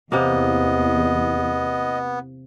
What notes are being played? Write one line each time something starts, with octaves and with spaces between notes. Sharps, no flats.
E2 C3 A#3 B3 D#5